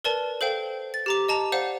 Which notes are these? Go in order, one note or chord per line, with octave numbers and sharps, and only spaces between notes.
A#4 B4 D5 A5
A4 C5 F5 G5
A6
G4 A#5 D6
D#5 A5 A#5
C5 D5 F5 F#5